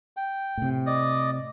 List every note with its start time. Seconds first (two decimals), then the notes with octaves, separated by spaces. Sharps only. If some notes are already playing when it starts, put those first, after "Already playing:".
0.17 G5
0.57 A2 C3
0.86 D5 D#5